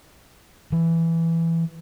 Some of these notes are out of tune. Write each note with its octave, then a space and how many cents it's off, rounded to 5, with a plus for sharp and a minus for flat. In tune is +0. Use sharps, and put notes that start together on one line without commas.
E3 +10